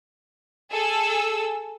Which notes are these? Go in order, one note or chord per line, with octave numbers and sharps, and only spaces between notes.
G#4 A4 E6